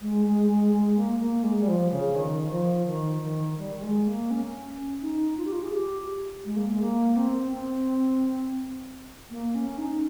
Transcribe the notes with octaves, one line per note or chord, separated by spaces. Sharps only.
G#3
G#3
G#3
G#3
A#3
A#3
G#3
G3
F3
C#3
D#3
F3
D#3
D#3
G3
G3
G#3
A#3
C#4
D#4
F4
G4
F4
G#4
G4
G#3
A#3
G#3
A#3
C4
C4
A#3
C#4
D#4